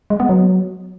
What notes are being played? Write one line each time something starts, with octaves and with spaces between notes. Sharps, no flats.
G#3
B3
F#3